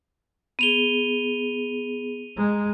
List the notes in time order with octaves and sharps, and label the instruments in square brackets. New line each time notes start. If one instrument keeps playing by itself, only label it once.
[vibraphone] B3 G#4 [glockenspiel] D#7 F7 G7
[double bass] G#3 [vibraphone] A#5